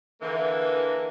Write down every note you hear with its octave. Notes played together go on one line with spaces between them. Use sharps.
D3 E3 A#3